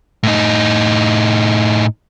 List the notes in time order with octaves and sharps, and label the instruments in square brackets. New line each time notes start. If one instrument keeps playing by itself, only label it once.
[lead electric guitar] A2 D#4